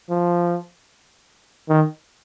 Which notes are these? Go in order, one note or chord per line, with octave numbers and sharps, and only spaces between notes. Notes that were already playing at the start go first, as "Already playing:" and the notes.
F3
D#3